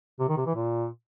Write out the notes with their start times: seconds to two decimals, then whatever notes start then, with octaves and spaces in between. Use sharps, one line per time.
0.20 C3
0.29 D#3
0.37 C3
0.46 E3
0.55 A#2